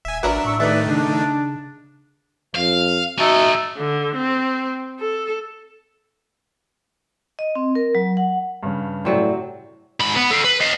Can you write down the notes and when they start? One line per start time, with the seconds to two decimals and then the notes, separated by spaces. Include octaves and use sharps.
0.05 D#1 E5 G#5
0.23 A1 F#3 D4 A#4 B4 E5
0.45 A2 C#6 E6
0.60 D#3 A3 D#4 G4 B4 D5 E5
0.88 C#3 D4
2.55 F2 F5
3.18 C#4 D#4 F#4 A4 E5
3.78 D3
4.16 C4
5.00 A4
7.39 D#5
7.55 C4
7.75 A#4
7.95 F#3
8.17 F#5
8.63 G2 C#3
9.05 A2 C3 F#3 C4 D5
10.00 G#2 B5
10.16 B3
10.31 A4 F5
10.44 B4
10.61 D#5 F5